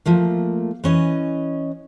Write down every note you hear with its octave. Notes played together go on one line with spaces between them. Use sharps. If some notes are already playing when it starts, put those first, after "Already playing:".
F3 A3 A#3
E3 C#4 D#5